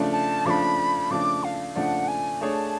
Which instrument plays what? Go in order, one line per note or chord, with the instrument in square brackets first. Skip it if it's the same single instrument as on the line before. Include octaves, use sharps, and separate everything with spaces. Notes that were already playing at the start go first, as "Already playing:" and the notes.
Already playing: [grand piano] C#3 F3 A3 D4
[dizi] A5
[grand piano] C#3 F3 A3 D4 [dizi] B5 D6
[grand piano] C#3 F3 A3 D4 [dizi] D6
[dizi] F5
[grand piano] C#3 F3 A3 D4 [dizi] F#5
[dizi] G#5
[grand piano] A3 D4 G#4 C#5 [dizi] A5